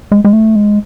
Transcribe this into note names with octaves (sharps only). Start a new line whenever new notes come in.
G#3
G#3
A3
G#3